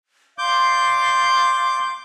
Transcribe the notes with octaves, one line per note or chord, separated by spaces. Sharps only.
D5 F5 C6 D6 G6